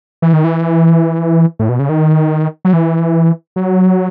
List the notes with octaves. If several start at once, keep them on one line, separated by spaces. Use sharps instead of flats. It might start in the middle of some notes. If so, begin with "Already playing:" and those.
E3
D#3
E3
A2
B2
C#3
D#3
F#3
E3
F#3